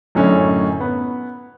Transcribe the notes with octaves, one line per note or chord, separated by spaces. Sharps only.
F#2 A2 D3 C#4 D#4
B3